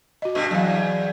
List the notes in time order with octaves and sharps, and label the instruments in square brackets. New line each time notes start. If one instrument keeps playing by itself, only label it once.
[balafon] F#4 D#5
[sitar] G2 B2 A3
[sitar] E2 [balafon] F#3 F5